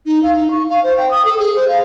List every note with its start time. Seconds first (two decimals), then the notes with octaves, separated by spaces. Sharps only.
0.06 D#4
0.23 F5
0.36 D#4
0.51 C#6
0.69 F5
0.84 C5
0.98 G5
1.11 D#6
1.25 A4
1.40 G#4
1.55 C5
1.68 F5